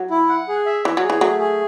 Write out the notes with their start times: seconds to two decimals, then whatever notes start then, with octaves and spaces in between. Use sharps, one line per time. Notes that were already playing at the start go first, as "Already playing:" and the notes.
Already playing: F#3
0.10 E4
0.29 F#5
0.48 G#4
0.66 E5
0.85 E3 C#5
0.97 F#3
1.03 G#4
1.10 E3
1.21 F#3 A3
1.40 G#4